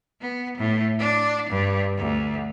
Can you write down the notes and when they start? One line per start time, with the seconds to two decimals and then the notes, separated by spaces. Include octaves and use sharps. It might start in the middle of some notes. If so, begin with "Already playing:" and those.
0.20 B3
0.57 A2
0.99 D4
1.49 G2
1.98 D2